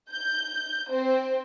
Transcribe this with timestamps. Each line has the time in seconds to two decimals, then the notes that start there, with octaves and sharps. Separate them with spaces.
0.10 G6
0.89 C4